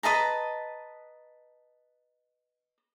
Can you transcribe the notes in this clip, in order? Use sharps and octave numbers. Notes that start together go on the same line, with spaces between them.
B4 D#5 A5 A#5